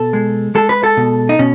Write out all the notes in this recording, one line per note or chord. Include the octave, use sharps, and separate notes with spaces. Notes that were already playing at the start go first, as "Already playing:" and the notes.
Already playing: B2 A4
G#3
G#3 A4
B4
A4
B2
D#4
B2 C#4